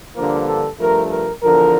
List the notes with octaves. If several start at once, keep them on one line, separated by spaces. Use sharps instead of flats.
G2 D3 F3 A#3 A#4
A4
G2 F3 A3 A#4
A#4
E2 D3 F3 A#4